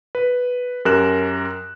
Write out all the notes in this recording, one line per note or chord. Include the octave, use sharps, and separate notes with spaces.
B4
F#2 G4 A#4 F#6 E7